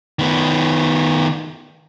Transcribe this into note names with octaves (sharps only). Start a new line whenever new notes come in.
D#3 B3